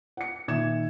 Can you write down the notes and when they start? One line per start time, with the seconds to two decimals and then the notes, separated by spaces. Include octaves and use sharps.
0.17 F#5 C#7
0.48 A#2 D#3 E5 G#6 E7